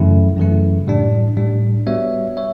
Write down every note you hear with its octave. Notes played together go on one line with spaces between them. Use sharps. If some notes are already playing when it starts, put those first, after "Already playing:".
Already playing: F#2 C#3 E3 A3 E4
F#2 C#3 E3 A3 E4
A2 G3 D4
A2 G3 D4
G3 B3 F#4 C#5 E5
C#5 E5